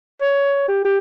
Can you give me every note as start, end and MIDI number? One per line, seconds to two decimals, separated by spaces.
0.21 0.66 73
0.68 0.80 67
0.84 0.98 67